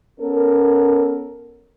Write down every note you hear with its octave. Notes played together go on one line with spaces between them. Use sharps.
B3 C#4 A4 A#4